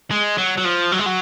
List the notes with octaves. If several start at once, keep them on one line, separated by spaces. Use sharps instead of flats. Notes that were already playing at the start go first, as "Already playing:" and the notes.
G#3
F#3
F#3
F3
F#3
G#3
F#3